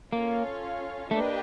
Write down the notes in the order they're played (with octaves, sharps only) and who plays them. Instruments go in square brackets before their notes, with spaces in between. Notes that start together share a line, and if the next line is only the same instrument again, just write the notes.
[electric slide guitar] A#3 [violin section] C#4 F4 A4 C#5 F5
[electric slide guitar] A3 [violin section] A#3 D4 G4 B4 D#5